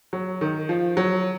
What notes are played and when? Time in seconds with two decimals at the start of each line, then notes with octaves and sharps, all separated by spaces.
0.13 F#3
0.41 D#3
0.69 F3
0.97 F#3